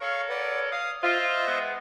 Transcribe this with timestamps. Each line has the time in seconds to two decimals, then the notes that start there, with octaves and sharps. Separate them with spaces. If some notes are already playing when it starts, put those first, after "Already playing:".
0.01 A4 A#4 C#5 F5 C#6
0.30 B4 D5 F#5
0.72 F5 D#6
1.03 F4 C5 D#5 E5
1.47 G#3 B3